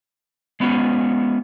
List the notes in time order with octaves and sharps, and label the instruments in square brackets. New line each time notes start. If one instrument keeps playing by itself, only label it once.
[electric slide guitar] G#3 B3 C#4 F#4